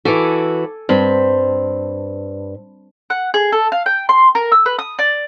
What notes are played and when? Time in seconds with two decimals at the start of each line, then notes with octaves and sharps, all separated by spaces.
0.05 E3 F#4 A4 G#5 D6
0.89 G2 C4 B5
3.10 F#5
3.34 G#4
3.52 A4
3.72 F5
3.86 G5
4.09 C6
4.35 A#4
4.52 E6
4.66 B4
4.79 D#6
4.99 D5